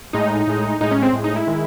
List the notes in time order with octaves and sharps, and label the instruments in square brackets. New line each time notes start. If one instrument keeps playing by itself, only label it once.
[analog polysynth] A2 G#3 D#4
A2 G#3
A2 G#3 D#4
C#4
C4
A2 G#3
D#4
E4
D#3 G#3